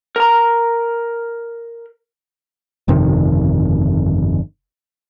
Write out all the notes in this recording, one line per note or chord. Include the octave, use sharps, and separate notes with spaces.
A#4 A#5
G1 F2 C3 D#3